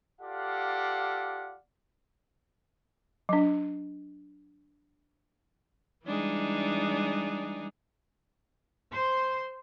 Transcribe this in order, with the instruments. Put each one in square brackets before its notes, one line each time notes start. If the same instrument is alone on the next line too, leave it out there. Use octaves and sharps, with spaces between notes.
[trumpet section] F4 G4 A4 D5 F5 F#5
[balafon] F#3 D4
[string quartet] E3 G3 G#3 D4 D#4 G#4
[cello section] C5